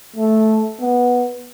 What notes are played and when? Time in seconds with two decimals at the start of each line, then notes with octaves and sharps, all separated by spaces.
0.16 A3
0.80 B3